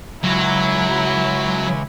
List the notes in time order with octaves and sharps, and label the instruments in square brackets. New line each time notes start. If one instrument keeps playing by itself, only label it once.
[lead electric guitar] C#2 [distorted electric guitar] F#3 [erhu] E4